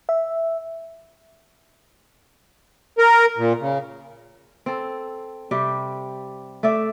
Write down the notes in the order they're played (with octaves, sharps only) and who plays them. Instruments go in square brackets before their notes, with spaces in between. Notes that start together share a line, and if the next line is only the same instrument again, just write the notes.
[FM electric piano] E5
[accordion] A#4
A#2
C#3
[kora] C4 A4
C3 G3 G4
A3 A4 D5 E5